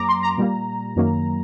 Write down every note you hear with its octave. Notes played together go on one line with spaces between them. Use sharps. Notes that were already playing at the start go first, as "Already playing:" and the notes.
Already playing: F#2 F#3 A#3 A#5 D6
C6
A#5
A#2 G3 A#3
F#2 D#3 F#3 A#3